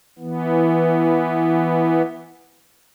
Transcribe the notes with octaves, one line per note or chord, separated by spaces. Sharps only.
E3 B3